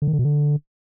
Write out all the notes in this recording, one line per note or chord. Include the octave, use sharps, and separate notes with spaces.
D3
D#3
D3
B2
D3